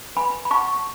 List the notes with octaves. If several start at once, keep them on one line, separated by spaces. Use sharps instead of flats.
B4 G#5 B5
B5
F#5 A5 C#6